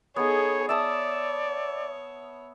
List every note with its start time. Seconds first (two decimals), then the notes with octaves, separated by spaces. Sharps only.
0.16 B3 D#4 G#4 A4 C#5
0.69 C#5 D5 E5 A5 D#6